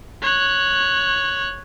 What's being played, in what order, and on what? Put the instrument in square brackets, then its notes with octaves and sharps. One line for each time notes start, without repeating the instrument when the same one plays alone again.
[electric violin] C#5 F#6